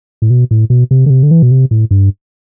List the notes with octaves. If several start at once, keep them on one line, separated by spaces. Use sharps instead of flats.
A2
B2
A2
B2
C3
D3
C3
D3
E3
B2
C3
A2
G2